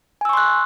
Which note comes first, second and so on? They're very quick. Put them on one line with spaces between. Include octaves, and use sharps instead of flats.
G#5 E6 C#6 C6 F#6